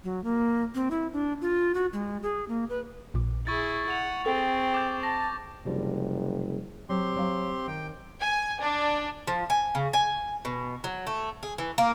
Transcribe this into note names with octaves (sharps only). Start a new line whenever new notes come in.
F#3
A#3
C4
E4
D4
F4
F#4
G#3
G#4
A#3
B4
A#1 A#2 D6
E4 G#4 C#6 A6
F#5 F7
C4 G#4 A4 G5
D6 G6
A5 A#6
F#1 C3 F3 G3
F#3 C4 G4 C6
F#3 F5
D#3 G5
G#5
D4
F3
G#5
C#3
G#5
B2
F#3
A3
G#4
E3
A#3